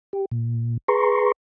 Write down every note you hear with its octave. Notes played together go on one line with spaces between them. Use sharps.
G4
A#2
G#4 B4 A#5 C6 C#6